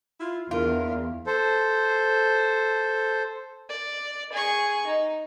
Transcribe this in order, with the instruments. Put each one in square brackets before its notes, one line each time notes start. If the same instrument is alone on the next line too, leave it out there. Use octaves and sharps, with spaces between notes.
[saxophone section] E4 F4
[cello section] E2 [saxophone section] D4 A#4 [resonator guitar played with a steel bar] F4
[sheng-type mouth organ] A4 C5
[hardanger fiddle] D5
G#4 C#6
D#4